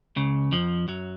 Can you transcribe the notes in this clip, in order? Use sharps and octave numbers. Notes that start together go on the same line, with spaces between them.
C#2 C#3
F2 F3
F#2 F#3